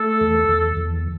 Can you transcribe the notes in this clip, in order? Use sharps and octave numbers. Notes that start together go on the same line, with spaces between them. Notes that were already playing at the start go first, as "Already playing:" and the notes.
Already playing: A3 A4
E2
E2
E2